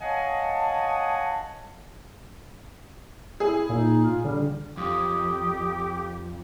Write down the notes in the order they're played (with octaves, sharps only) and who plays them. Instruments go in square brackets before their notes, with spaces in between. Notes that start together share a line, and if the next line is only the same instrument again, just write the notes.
[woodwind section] C#5 D#5 F5 F#5 G#5 A5
[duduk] E4 [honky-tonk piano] G#4
[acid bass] A#2 [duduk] D#4
[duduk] F4
[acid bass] D3 [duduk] G3
[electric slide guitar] F2 [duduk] G4 [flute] D#6